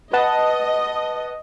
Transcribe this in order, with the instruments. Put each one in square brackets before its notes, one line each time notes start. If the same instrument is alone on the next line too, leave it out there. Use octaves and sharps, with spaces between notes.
[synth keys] B4 F#5 A5 [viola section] D#5